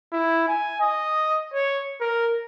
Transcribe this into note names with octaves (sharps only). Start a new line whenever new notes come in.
E4
G#5
D#5
C#5
A#4